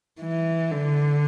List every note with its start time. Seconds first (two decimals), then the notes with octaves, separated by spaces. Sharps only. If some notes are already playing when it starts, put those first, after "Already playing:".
0.21 E3
0.72 D3